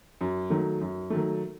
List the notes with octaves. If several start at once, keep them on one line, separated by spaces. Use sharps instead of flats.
F#2
D#3 F#3 A3
F#2
D#3 F#3 A3